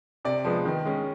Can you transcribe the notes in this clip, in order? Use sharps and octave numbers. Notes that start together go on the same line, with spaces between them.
C3 D5
F3 G#3 B3
D#3
G#3 C#4